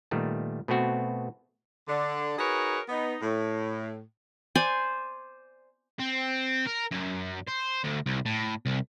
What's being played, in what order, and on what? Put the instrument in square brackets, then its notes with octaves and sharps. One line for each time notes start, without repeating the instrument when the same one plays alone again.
[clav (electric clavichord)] A#2 D#3 G3 A3 B3
B2 A3 B3 C4 F#4
[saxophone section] D3 D4
D#4 F#4 G#4 A#4 B4 C#5
B3 D#4
A2
[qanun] C5 D5 G#5
[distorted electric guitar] C4
A#4
F#2
C5
D2
C2
A2
C2